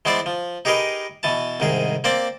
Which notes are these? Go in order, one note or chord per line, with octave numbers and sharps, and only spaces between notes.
E3 G#3 B3 E4 C5 D5
F3
D#4 G4 G#4 A#4 B4 D#5
B2 E3 A5
C2 G#2 D#3 G#4
A#3 C4 C5 D5